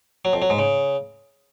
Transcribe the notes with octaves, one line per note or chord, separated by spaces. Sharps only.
F#3
F2
F#3
G#2
C#3